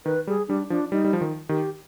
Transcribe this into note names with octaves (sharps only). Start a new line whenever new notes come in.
D#3 B4
G3 G#4
G3 D4
F3 D4
G3 D#4
G3
F3
D#3
D#3 G4